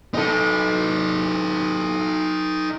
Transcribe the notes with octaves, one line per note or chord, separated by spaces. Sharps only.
D#4 A4